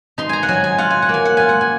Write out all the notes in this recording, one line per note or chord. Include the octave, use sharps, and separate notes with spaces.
D#4 C6
G#5 A#5
F#5
F#3 G#5
G#5
F4 F#5
G#5
F#5
A#3 G#5
F#5
F4 G#5
F#5
G#5